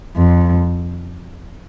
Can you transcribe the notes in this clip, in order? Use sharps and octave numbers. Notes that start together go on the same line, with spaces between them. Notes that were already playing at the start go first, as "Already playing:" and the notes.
F2